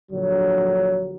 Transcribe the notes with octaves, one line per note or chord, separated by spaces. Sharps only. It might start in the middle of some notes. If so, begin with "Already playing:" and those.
A#1 D3 F#3